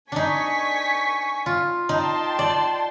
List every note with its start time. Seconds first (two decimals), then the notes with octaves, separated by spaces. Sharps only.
0.12 D4 D#4 G#5 C#6 B6
1.46 F4
1.89 D#4 G5 A5 C6
2.39 D5